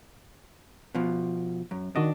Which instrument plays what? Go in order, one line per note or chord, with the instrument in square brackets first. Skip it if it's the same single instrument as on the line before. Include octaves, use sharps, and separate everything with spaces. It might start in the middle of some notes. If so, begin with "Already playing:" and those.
[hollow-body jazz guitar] B2 F3
F#2
[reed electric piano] D#3 F#4 D#5 [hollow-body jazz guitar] D4